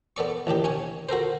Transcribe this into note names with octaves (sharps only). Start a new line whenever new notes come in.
B3 A4 D5 C#6
A1 D#2 D4 G4
C#4 C#5 G#5
F#4 A4 A#4 C5